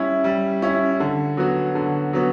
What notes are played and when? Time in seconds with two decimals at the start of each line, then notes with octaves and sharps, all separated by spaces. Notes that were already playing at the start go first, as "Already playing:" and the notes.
Already playing: G3 C#4 E4
0.24 G3
0.62 C#4 E4
1.00 D3
1.37 F#3 B3 F#4
1.75 D3
2.13 F#3 B3 F#4